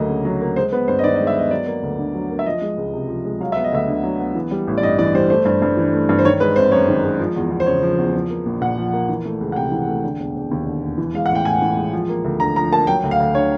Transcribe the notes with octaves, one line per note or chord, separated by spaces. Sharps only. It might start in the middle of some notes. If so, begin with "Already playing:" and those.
Already playing: D2 F#3 A3 A#3 D#5
C#3
F#3
A#3
G#3 C5
B3 B4
G2 C5
D#5
D#3 D5
D#5
G#3
E5
B3 D#5
F#3 D5
A#3
D2
D3
F#3
A#3
E5
F3 D#5
G#3
C#2
C3
F3
G#3
F#3 F5
B3 E5
D#5
D2 E5
D3
F#3
B3
E3
G3
A1
D5
G2 D#5
E3 D5
G3 C5
A3 C5
G2
G2
E3
A3
G2
C5
D#3 C#5
G#3 B4
G#1 C5
F#2 C#5
D#3
G#3
F3
E2
E2
C5
C#3 C#5
F3
E2
F3
A#3
A#1
A#2 F#5
F3
A#3
E3
A3
C#2
F#5
C3 G5
E3
A3
D3
E1
E1
D#2
D3
E1
E3
G#3 F5
A1 F#5
G5
A2 G#5
E3
G#3
F3
A#3
D2
D3 A#5
F3 A#5
A#3 A5
F#3 G5
D2
F5
D2
D3 C#5